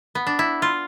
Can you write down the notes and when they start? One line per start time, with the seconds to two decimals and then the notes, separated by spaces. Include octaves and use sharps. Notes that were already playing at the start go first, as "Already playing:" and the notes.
0.15 B3
0.27 D4
0.39 E4
0.62 F4